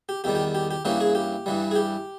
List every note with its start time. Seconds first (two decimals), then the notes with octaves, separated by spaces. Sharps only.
0.09 G4
0.24 E2 D#3 G3 G4
0.35 G4
0.55 G4
0.71 G4
0.85 G2 E3 A#3 C#4 G4
1.01 G#4
1.15 G4
1.46 G2 E3 G3
1.71 G#4
1.76 G4